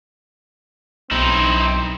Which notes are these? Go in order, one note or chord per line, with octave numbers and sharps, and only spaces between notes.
B1 C4 D#4 E4